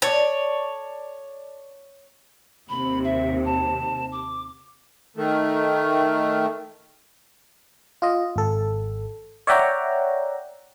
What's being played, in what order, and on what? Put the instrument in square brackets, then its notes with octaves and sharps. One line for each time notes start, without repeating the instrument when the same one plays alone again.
[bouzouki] A4 D5 [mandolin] C#5
[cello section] D#2 C3 [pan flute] B5
[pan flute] E5
A5
D6
[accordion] D#3 A3
[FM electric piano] F4 D#5
G#1 A4
C#5 D5 E5 F#5 G5 A#5